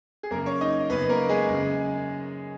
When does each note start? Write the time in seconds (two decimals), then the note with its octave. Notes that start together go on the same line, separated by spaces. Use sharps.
0.23 G#4
0.31 F#2 C#3 A#3 A#4
0.46 C#4 C#5
0.61 D#4 D#5
0.89 F#2 C#3 B3 B4
1.09 A#3 A#4
1.29 G#3 G#4
1.49 F#2 C#3